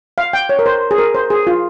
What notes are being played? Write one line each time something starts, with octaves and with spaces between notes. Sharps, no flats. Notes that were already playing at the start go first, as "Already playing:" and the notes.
F5
G5
C#5
A#4
C5
G#4
A#4
C5
G#4
F4